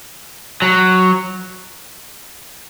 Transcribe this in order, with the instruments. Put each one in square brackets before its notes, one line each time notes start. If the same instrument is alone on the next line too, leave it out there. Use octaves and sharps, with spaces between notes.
[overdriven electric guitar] F#3